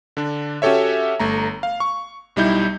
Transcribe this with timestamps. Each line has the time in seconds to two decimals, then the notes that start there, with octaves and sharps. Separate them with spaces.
0.17 D3 D4
0.62 C#4 F#4 G4 A4 C#5 E5
1.20 G1 A3 A#5
1.63 F5
1.80 C#6
2.36 B1 G3 D#4 E4 G6